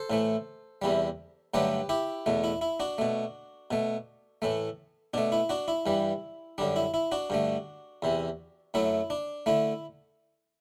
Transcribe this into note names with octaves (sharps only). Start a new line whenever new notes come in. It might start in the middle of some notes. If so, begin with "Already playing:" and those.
Already playing: A4 C5
A2 E3 A3
E2 C3 E3 G3
G2 D3 F#3 A3 G4 B4
E4 G4
E2 B2 A3
E4
E4
D4 F#4
B2 A3
B2 A3
A2 E3 A3
B2 A3 D4
E4
D4 F#4
E4
G2 E3 G3
F#2 D3 G3 D4
E4
E4
D4 F#4
G2 D3 A3
E2 C3 E3
F#2 F#3 A3 E4
D4
D3 A3 E4